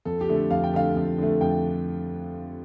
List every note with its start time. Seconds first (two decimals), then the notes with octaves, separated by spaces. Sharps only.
0.05 F2 A4
0.21 G4
0.29 D3 A3
0.36 A4
0.51 F2 F5
0.64 G5
0.74 D3 A3 F5
0.96 F2
1.18 D3 A3
1.41 F2 G5